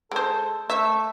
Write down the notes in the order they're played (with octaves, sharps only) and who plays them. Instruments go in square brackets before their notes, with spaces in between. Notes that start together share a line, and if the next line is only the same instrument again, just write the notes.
[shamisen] G#3 C5 [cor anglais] A4
[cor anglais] A3 [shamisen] E5